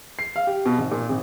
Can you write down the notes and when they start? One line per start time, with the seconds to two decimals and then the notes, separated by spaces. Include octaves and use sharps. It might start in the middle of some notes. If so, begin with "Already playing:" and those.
0.19 C7
0.36 F5
0.47 G4
0.65 B2
0.78 G#1
0.92 A#2
1.09 G#1